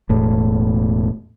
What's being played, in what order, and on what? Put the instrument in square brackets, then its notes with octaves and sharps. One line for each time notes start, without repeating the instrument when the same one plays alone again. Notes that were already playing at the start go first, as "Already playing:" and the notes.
[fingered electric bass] E1 A2